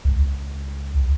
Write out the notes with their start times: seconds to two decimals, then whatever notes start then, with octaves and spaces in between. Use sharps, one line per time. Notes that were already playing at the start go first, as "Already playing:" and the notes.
0.05 C#2